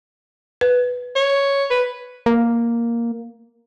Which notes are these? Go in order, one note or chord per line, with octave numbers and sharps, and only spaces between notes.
B4
C#5
B4
A#3